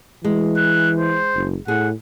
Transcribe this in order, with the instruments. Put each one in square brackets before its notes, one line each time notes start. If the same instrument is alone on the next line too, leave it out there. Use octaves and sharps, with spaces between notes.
[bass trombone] E3 [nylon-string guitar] G#3
[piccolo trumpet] F#6
C5
[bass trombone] F#1
[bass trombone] A2 [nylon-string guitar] G#4 [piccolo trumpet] F#5